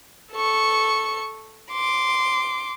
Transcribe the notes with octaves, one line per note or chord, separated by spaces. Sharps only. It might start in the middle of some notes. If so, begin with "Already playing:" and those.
A4 C#6
C6 D6